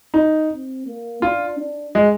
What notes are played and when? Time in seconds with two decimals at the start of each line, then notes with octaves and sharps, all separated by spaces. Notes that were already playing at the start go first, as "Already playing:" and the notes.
0.14 D#4
0.51 C4
0.86 A#3
1.22 D4 F4
1.59 D4
1.95 G#3